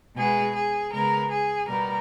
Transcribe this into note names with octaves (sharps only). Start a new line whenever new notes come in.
B2 G#3 B3 G#4
G#4
C#3 G#3 B3 A#4
G#4
B2 G3 B3 A#4